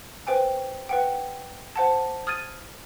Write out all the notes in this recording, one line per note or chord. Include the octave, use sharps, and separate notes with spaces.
B4 C5 G5 G#5
B4 F#5 G5
C5 F#5 A5
D#6 F6 G#6 A6 D#7